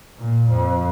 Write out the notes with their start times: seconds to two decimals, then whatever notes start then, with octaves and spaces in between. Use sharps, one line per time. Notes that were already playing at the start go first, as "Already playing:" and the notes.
0.18 A#2
0.51 F2